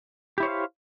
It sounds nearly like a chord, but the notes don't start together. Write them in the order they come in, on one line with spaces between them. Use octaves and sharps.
G4 E4 C#5 C5 F5